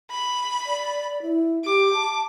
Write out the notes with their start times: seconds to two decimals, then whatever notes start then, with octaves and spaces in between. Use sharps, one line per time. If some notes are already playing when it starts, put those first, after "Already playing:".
0.11 B5
0.66 D5
1.22 E4
1.65 G4 D6
1.94 A5